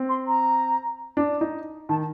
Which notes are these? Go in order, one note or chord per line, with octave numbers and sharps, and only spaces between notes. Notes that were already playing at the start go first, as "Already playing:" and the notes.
Already playing: C4
C6
A#5
D4
D#4
D#3 A5